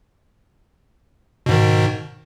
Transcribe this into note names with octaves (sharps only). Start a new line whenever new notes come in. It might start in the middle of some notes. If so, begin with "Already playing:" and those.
G#2 B2 D#3